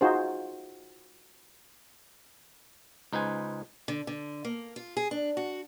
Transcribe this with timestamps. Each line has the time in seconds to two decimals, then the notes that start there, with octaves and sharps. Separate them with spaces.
0.01 D#4 F4 F#4 G#4 C5
3.13 C#2 D#4 B4 C5 G#5
3.88 D3
4.07 D3
4.45 A#3
4.76 F4
4.97 G#4
5.11 D4
5.37 F#4